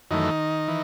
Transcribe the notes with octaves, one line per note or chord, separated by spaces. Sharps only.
F#2 D#3 E3 A3 D#4
E3